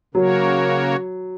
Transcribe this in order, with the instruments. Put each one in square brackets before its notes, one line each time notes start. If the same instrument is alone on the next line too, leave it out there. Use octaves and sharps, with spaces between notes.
[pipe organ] C#3 A#3 F#4 A#4 C#5 [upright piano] F#3